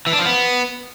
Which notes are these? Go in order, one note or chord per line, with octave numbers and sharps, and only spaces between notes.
E3
D4
F3
B3